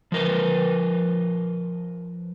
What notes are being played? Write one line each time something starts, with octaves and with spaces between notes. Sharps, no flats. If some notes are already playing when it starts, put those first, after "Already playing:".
F3 A#4 B4